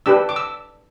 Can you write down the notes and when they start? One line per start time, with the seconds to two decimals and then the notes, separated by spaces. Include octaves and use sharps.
0.06 D4 G4 B4 E6
0.29 D6
0.36 E6